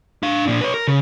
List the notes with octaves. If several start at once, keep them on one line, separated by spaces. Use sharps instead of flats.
D4 F5
A#2 D4
B4 C#5
A#4
C#3